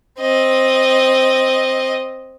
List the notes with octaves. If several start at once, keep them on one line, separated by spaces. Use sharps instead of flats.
C4 D#5